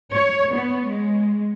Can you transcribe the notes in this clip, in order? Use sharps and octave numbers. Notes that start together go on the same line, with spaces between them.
C#5
B3
G#3